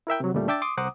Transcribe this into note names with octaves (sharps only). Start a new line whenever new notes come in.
E4 A#4 E5 G5
C3 F#3
D2 A#2 C#3 G3 A3
D4 E5 G5 D6 E6 A6
C6 D6 D#6
C2 C5 F#5 A#5 D6 D#6